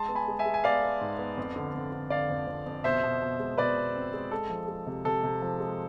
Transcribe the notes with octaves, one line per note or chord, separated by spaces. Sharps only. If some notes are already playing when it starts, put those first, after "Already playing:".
Already playing: G#3 A5 C6
B3
G#5 B5
G#3
E5 G#5
G#3
G#5
B3 D5 F5
B3
G#2
B3
F2
D3
F2
D3
D3 D5 F5
F2
F2
F2
B2 C5 E5
B2
B2
G#3
B2 B4 D5
B2
C4
G#3
G#3 A4
F3
G#3
C3
C3 A4
C3
F3
G#3